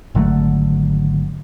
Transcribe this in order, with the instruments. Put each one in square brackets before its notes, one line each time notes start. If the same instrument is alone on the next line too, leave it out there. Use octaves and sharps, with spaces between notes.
[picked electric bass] G#1 D3 F#3 A3